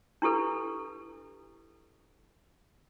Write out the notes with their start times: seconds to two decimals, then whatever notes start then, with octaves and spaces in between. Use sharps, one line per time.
0.22 D4 E4 G4 A4 B4